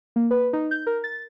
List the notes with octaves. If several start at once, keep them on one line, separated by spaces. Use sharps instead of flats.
A#3
B4
D#4
G6
A#4
A6